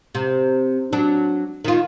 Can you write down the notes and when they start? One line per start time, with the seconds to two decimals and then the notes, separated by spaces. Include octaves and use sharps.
0.15 C3
0.93 F#3 D4
1.64 D#3 F4